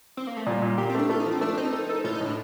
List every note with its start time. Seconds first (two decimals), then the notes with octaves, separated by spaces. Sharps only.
0.17 C4
0.27 A#3
0.37 A3
0.46 A#2 G3
0.62 A#2
0.78 A#3 G4
0.89 C4
0.95 A3 D4
1.10 A3 F4
1.20 D#4
1.26 F3
1.31 C4
1.41 A3 D4
1.57 C4 D#4
1.73 A4
1.89 A4
2.04 A2 F4
2.15 D#4
2.21 A2
2.26 D4